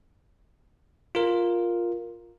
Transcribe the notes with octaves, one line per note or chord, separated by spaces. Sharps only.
F4 A#4